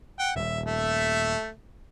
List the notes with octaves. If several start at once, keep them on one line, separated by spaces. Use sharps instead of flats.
F#5 G5
D#1 E5
A3 E5